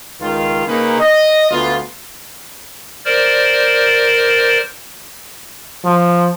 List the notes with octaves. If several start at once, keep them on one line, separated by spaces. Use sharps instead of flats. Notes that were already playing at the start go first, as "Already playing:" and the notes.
C#2 D#3 F4
C#3 A#3 C#4 D#4 B4
D#5
D2 B3 F4
A#4 C5 D5
F3